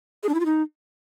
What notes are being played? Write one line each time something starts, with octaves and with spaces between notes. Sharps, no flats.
G#4
D4
E4
F4
D#4